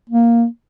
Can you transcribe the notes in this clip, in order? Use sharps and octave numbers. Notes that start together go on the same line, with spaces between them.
A#3